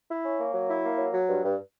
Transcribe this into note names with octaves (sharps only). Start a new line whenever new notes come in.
E4
C#4
A#3
F#3
E4
A#3
F#3
F#3
G2
G2